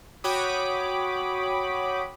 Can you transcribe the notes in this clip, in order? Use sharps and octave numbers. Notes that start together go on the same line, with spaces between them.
F#4 C#5 G5 B5 D6 D#6